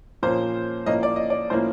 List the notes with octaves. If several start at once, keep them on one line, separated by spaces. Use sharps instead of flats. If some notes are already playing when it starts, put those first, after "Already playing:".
A#2 F3 A#3 C#4 C5
A2 F3 A#3 C#4 D#5
D5
D#5
D5
A2 F3 A#3 C#4 C5